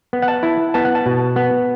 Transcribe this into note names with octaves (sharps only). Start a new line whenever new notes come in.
B3
F#5
A5
E4
B3 A5
F#5
A5
B2
B3